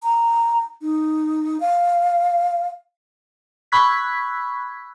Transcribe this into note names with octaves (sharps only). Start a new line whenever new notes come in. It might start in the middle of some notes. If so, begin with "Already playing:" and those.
A#5
D#4
F5
B5 C#6 E6 F#6 G#6 B6